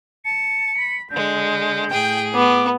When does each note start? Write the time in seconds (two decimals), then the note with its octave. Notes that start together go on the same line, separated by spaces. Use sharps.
0.25 A5 C#7
0.76 B5
1.11 D3 G#3 G6
1.91 A2 G#4 G5
2.34 B3 D6